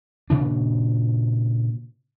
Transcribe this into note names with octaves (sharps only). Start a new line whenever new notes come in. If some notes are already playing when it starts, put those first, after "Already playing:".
A#2 C#3 D4